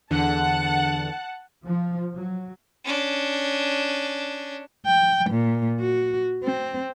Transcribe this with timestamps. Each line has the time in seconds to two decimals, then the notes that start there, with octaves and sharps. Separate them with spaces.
0.11 E2 D3 F#5 A5
1.65 F3
2.14 F#3
2.84 C#4 D4
4.86 G5
5.30 A#2
5.80 F#4
6.44 C4